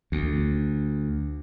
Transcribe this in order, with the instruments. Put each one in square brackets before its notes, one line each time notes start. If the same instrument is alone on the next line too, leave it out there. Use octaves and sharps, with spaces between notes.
[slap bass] D2